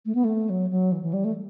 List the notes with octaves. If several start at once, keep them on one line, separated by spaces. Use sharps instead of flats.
A3
B3
A3
F#3
F#3
E3
E3
G3
A3